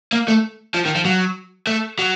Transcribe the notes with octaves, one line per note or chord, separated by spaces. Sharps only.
A#3
A3
F3
D#3
F3
F#3
A3
F#3